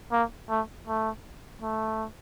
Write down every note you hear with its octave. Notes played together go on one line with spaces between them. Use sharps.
A#3
A3
A3
A3